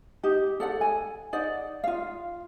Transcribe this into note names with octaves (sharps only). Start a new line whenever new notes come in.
D#4 G4
A4 D5 F#5
G#5
D#4 D5 F#5
F4 F5